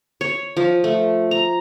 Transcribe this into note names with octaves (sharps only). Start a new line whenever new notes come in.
C#5
F3
A3
A#5